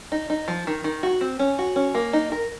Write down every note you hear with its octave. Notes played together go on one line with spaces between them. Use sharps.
D#4
D#4
F3
D#3
D#3
F#4
C4
C#4
F#4
C#4
A#3
D#4
A#4